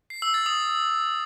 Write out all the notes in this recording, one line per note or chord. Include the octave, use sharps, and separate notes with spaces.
C7
E6
A6
D#6